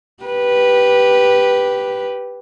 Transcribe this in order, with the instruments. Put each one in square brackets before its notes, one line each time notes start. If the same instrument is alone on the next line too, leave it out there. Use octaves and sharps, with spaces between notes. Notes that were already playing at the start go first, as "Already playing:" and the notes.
[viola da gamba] G4 B4